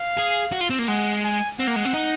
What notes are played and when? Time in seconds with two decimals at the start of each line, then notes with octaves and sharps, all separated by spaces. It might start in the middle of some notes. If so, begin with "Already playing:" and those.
Already playing: F5
0.17 G#4
0.52 F#4
0.61 F4
0.70 C4
0.79 A#3
0.88 G#3 F#5
1.24 G#5
1.59 C4 F#5
1.68 A#3
1.76 G#3
1.86 C4
1.94 D#4